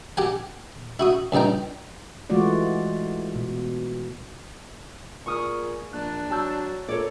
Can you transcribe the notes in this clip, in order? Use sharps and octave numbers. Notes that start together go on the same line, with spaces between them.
G4 F#5 G#5
E4 F#4 D#6
C#2 G2 G3 D#4 G5
E3 G#3 A3 F4 F#4 D5
B2
A#2 G#4 C#6 D#6 F6
A#1 D4 F#6
F#3 A5 E6 G6
A#2 A4 C#5 D5